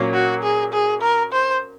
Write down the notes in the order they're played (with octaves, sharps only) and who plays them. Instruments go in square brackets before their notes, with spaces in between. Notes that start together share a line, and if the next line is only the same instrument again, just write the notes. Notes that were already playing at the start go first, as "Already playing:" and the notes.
Already playing: [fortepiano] A#2 F#3 A#3 C#4
[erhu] F#4
G#4
G#4
A#4
C5